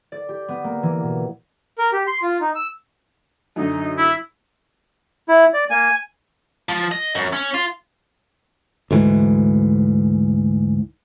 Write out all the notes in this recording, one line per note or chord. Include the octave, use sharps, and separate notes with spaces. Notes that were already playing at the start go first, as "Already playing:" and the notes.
D5
G4
B3
A#3
E3
B2
A#4
G4
C6
F4
D#4
E6
F#2 D3 D#4
E4
E4
D5
A#3 G#5
F3
D#5
F#2
C#4
F4
D2 G#2 E3